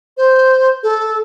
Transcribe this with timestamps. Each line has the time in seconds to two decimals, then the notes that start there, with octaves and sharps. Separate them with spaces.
0.17 C5
0.83 A4